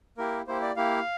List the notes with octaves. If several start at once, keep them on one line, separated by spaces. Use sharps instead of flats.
A#3 E4 G4 A#4
A#3 E4 G4 C5
D5
A#3 E4 G4 F5